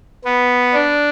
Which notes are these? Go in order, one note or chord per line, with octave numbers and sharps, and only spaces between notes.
B3
D4